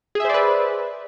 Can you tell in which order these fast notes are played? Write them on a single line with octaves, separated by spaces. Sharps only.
G#4 E5 C5 D5 B4